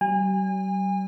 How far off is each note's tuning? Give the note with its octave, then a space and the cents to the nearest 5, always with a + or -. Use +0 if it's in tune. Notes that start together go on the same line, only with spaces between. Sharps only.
G3 -45 G#5 -35